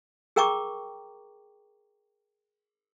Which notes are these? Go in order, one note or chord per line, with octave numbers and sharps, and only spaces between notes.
G#4 A#4 G5 A#5 C#6 D6